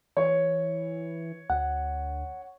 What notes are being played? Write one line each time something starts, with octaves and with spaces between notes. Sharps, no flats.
E3 C#5
D2 F#5